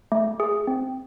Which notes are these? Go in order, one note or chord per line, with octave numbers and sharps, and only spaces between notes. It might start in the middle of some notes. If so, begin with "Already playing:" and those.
A3
G#4
C4